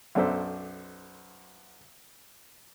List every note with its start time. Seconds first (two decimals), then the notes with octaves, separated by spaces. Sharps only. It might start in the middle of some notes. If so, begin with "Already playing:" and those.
0.15 B1 F#2 D4 A4 C5 E5